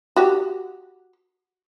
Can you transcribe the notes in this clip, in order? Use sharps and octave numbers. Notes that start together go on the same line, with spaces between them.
F#4 G4